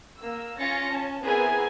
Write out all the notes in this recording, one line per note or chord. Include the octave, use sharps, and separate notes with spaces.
A#3 E6
C#4 F4 A6 A#6 C#7
C#4 A5
B3 C4 E4 G#4 A#4 G#5